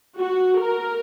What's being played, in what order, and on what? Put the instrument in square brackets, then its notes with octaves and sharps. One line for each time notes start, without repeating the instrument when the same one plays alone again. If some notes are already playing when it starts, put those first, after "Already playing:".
[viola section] F#4
A#4